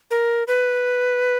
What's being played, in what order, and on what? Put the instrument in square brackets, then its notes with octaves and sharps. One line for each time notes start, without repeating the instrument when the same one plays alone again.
[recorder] A#4
B4